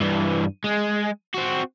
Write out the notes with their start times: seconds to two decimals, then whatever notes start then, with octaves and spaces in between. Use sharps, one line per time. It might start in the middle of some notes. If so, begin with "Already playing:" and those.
0.01 G2 E3
0.64 G#3
1.35 C4 F#4